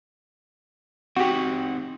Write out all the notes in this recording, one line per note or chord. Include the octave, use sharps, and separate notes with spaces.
C4 D#4 F#4 G4 F#5